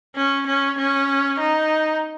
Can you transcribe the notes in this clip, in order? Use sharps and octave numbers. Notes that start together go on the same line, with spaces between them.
C#4
C#4
C#4
D#4